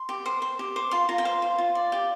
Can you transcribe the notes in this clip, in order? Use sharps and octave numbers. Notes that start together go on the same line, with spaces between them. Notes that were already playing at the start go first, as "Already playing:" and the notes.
Already playing: C6
G4
C5
C5
G4
C5 D6
F4 C6
F4 A#5
G5
C5 F5
C5
F4
D5
G4